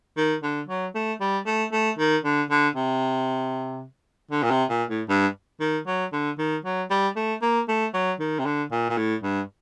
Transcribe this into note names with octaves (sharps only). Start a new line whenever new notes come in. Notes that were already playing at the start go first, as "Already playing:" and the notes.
D#3
D3
F#3
A3
G3
A3
A3
D#3
D3
D3
C3
D3
A#2
C3
A#2
A2
G2
D#3
F#3
D3
D#3
F#3
G3
A3
A#3
A3
F#3
D#3
C3
D3
A#2
A#2
A2
G2